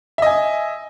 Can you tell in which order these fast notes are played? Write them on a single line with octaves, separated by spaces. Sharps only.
E5 D#5 G#5